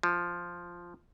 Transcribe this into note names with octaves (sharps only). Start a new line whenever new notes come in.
F3